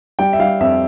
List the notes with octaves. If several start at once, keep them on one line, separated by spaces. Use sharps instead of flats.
G3 G5
E5
G3 F5
F2 E5